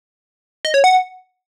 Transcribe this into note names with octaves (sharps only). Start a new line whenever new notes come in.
D#5
C#5
F#5